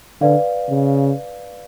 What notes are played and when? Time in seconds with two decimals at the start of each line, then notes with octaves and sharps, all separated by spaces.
0.21 D3 B4 D5 F5
0.70 C#3